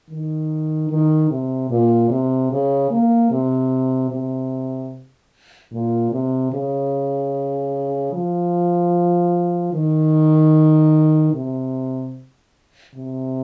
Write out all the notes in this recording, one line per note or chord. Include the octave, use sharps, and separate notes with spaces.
D#3
D#3
C3
A#2
C3
C#3
A#3
C3
C3
A#2
C3
C#3
F3
D#3
C3
C3